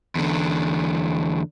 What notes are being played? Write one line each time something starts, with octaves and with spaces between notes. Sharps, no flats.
E2 D3